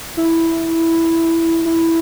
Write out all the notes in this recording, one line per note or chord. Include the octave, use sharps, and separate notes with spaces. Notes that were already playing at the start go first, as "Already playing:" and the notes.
E4
E4